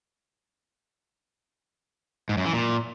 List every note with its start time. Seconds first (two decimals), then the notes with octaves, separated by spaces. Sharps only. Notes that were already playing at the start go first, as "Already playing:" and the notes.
2.29 G#2
2.37 F#2
2.45 E3
2.54 A#2